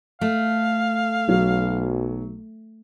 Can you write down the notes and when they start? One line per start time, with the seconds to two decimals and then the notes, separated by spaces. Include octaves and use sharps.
0.21 A3 F5
1.29 B1 F#3